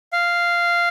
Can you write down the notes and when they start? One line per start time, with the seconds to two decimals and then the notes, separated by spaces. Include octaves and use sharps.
0.13 F5